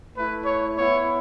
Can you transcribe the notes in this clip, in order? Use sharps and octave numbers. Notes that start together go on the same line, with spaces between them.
A3 E4 B4
C#5
B3 E4 C#5